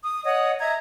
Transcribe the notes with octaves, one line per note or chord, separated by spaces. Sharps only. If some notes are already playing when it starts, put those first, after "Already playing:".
D#6
C#5 D#5 F#5 D#6
D#5 E5 A#5 G#6